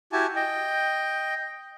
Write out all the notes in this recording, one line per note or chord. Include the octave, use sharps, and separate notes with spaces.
E4 F#4 G4 G#5 A5
D#5 G5